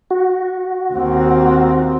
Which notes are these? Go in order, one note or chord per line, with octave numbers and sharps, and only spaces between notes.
F#4
D#2 C4